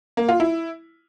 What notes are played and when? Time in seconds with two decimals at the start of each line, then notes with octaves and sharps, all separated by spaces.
0.17 A#3
0.29 F4
0.40 E4